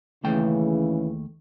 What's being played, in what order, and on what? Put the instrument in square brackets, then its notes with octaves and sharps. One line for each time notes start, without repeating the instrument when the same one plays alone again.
[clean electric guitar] D#2 A3 G5 [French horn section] C#3 E3